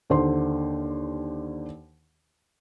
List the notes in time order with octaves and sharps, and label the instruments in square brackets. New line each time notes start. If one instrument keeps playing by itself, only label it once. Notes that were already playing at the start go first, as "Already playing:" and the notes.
[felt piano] D#2 D3 C5 C6